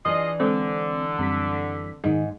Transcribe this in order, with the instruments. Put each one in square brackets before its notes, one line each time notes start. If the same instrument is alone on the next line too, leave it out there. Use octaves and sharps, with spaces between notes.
[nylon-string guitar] E3 D4 [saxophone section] F4 G#4 D#5
[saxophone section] D3 [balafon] G#3 A4 [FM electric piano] C4
[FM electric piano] F#2 G3 B6 [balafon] C4
[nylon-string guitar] G#2 [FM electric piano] D#3 D#4 G#4 [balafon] D#5